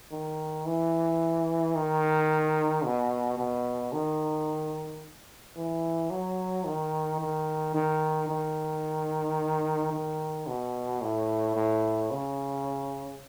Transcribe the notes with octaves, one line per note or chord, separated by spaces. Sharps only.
D#3
E3
D#3
B2
B2
D#3
E3
F#3
D#3
D#3
D#3
D#3
D#3
B2
A2
A2
C#3